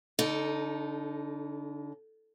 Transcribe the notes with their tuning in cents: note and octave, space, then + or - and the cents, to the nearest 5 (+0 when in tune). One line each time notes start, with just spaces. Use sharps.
D3 -35 D#4 +0 A4 +0